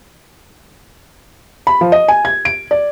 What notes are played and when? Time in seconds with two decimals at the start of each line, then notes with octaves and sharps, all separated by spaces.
1.67 B5
1.81 F3
1.92 D#5
2.08 G#5
2.25 G#6
2.45 D7
2.71 D5